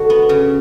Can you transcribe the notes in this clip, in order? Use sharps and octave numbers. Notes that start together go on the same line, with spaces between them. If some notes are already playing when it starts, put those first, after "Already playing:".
Already playing: D3 F#4
B3
C#3